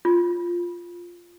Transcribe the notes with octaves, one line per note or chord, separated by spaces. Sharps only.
F4